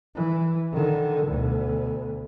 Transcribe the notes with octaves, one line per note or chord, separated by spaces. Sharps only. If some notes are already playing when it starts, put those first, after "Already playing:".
E3
D3 D#3
D2 B2